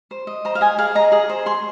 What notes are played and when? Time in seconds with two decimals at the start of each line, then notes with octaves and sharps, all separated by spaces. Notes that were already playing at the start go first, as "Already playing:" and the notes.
0.11 C5
0.27 D#5
0.45 C5 A#5
0.55 F5
0.61 D#5 G#5
0.78 G#4 F5
0.95 D#5 A#5
1.12 G#4 D#6
1.29 C5
1.46 G#4 C6